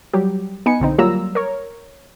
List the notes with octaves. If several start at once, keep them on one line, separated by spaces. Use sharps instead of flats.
F#3 G3 G4
B3 D#4 B4 G#5 C#7
B1 D3 C4 D#4
F#3 G3 A#3 F4 A#5 E6
A#4 C#5